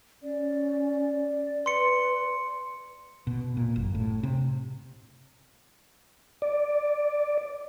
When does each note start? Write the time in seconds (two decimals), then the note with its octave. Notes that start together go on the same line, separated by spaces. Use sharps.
0.23 C#4 D5
1.66 B4 C6 C#7
3.27 B2
3.57 A#2
3.76 F#1
3.95 A2
4.23 C3
6.42 D5